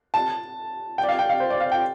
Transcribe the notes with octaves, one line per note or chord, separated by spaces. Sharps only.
A5
G5
D5
F5
G5
F5
C5
D5
F5
G5